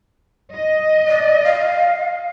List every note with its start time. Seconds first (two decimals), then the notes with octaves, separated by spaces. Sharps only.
0.54 D#5
1.08 D5
1.44 F5